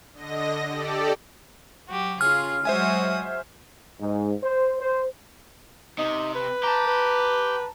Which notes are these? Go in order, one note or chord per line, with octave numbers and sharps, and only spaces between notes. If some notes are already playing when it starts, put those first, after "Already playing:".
D3 D#5 A#6
G4 A4 D5
F#3 F#4 G4
C#3 C#4 F4 G#4 F6
F#3 G#3 F#4 C5 E5 G#5 D#6
G#2
C5
C5
C3 D#4
B4
G4 A5 A#5
B4